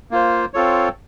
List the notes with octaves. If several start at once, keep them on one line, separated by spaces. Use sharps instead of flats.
A#3 F4 C5
C4 F4 A4 C#5